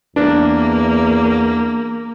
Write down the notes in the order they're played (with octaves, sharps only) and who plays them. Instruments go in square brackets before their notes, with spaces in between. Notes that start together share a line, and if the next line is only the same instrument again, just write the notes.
[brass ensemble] E2 [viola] A#3 [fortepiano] D4